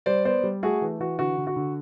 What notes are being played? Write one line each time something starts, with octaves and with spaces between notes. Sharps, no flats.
G3 C5 D5
B3 C5 D5
G3
A3 F#4 G#4
E3
E3 F#4
D3 F#4
D3
F#4
D3